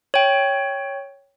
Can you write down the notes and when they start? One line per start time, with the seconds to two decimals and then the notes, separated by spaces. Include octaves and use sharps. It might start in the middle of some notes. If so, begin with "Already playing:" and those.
0.14 C#5 G5